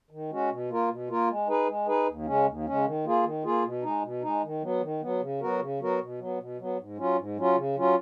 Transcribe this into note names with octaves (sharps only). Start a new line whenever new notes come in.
D#3
G#3 C#4 F#4
B2
A#3 F4 A#4
B2
A#3 F4 A#4
G#3
D#4 G#4 B4
G#3
D#4 G#4 B4
D#2
C#3 G#3 C#4
D#2
C#3 G#3 C#4
D#3
A#3 F4 G#4
D#3
A#3 F4 G#4
B2
G#3 D#4
B2
G#3 D#4
D#3
F#3 B3
D#3
F#3 B3
C#3
F#3 B3 F#4 A#4
C#3
F#3 B3 F#4 A#4
B2
F#3 B3
B2
F#3 B3
G#2
F#3 C#4 F4
G#2
F#3 C#4 F4
C#3
F#3 C#4 F4